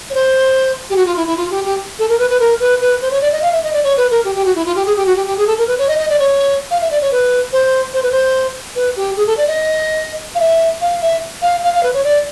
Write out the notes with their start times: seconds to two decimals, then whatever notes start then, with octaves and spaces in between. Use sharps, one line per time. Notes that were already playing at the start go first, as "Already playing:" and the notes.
0.10 C#5
0.14 C5
0.90 G4
0.96 F#4
1.06 F4
1.16 E4
1.27 E4
1.37 F4
1.51 G4
1.65 G4
1.99 A4
2.09 A#4
2.19 B4
2.30 B4
2.40 A#4
2.60 B4
2.81 B4
3.02 C5
3.11 C#5
3.21 D5
3.32 D#5
3.42 F5
3.52 E5
3.63 D#5
3.73 D5
3.84 C#5
3.97 B4
4.11 A#4
4.25 G4
4.35 G4
4.45 F#4
4.55 E4
4.66 F4
4.76 G4
4.86 G#4
4.96 G4
5.06 F#4
5.16 G4
5.27 G4
5.37 G#4
5.47 A4
5.58 A#4
5.67 B4
5.79 C#5
5.88 D#5
5.99 D#5
6.10 D5
6.19 C#5
6.71 F5
6.81 E5
6.91 D5
7.02 C#5
7.12 B4
7.53 C5
7.93 C5
8.03 B4
8.12 C5
8.76 B4
8.96 G4
9.17 G#4
9.27 A4
9.37 D5
9.47 D#5
10.35 F5
10.40 E5
10.81 F5
11.02 E5
11.42 F5
11.64 F5
11.74 F5
11.83 B4
11.94 C#5
12.04 D5